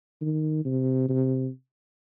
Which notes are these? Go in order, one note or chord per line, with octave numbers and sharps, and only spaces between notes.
D#3
C3
C3